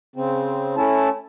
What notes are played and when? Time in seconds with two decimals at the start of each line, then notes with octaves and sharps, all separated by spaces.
0.16 C#3 C4
0.77 A3 C#4 E4 A5